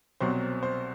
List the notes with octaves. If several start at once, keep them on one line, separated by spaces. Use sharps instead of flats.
C2 B2 F#3 C4 C5
C5